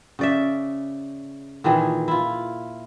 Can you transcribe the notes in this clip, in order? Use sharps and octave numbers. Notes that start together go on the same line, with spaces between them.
C#3 D5 E5
A#2 D#3 E3 G#4
E4 F4